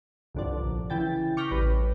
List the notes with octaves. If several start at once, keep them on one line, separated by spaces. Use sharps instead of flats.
C2 G2 D3 F3 D5
A#1
C#3 E3 G5 A6
C#6 D6 F6 G6 A#6 B6
A1 G3 B4